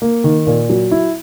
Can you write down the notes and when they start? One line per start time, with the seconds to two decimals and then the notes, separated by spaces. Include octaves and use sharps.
0.02 A#3
0.24 D#3
0.47 A#2
0.70 F#3
0.91 E4